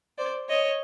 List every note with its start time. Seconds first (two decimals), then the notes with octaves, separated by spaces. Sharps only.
0.18 C5 D5
0.48 C#5 D#5